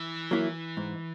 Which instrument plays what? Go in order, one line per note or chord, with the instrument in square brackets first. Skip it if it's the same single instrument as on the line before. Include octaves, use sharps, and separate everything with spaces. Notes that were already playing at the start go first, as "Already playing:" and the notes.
Already playing: [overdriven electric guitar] E3
[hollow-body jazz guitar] F#3 A#3 E4
G#2